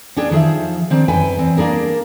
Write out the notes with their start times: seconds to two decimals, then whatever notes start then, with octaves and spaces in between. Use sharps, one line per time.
0.16 B3 C#4 D4 G#4 G5
0.31 D#3 F3 G#4 E5
0.90 D#3 C4 D4
1.08 F#2 B4 G5 G#5
1.38 E2 C4
1.57 A#3 D4 G#4 A#4